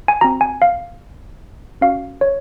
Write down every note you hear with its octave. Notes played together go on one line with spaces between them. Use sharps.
G#5
C4 F#4 A#5
G#5
F5
C#4 F#4 F5
C#5